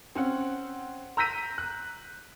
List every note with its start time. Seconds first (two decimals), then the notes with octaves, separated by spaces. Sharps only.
0.15 C4 C#4 F#5
1.17 A#5 E6 G6 A#6 B6 D#7
1.58 F#6